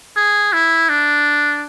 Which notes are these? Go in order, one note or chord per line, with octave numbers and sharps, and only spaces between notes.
G#4
E4
D4